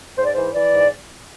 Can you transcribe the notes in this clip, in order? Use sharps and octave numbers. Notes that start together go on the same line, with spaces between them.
G#2 C5
D5
E3 C5
E3 D5
G#2